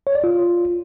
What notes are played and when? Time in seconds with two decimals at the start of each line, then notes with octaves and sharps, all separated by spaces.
0.07 C#5
0.15 D5
0.24 F4